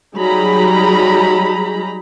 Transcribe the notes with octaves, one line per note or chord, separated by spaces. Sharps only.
F#3 G3 D#4 G#4 A#5 B5